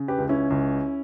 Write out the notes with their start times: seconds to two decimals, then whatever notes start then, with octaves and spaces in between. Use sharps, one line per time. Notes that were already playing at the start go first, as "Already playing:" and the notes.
Already playing: C#3
0.08 G4 B4
0.18 C#2
0.29 C#4 E4
0.50 C#2